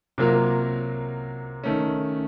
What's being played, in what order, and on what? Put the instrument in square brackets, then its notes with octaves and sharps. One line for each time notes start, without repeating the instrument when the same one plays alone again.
[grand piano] C3 F#3 A#3 F4 A#4
D#3 A3 C#4